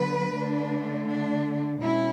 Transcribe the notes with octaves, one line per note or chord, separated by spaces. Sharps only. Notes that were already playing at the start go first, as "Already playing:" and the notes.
Already playing: D3 F#3 B3 B4
D3 A3 D4
D4
B2 G#3 C#4 E4